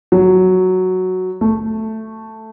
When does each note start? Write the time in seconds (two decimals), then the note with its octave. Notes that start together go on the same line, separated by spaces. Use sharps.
0.12 F#3
1.41 A3